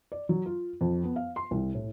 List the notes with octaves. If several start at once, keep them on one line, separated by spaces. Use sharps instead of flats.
D5
F#3
F4
F2
B3
F5
C6
C2
A2